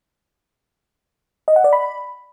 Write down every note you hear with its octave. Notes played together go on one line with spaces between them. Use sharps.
D#5
F#5
D5
B5